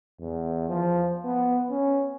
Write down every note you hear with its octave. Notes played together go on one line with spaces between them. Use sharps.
E2
F3
B3
C#4